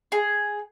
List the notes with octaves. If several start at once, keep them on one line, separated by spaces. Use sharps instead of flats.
G#4